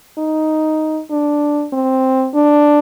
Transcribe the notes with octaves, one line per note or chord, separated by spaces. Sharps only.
D#4
D4
C4
D4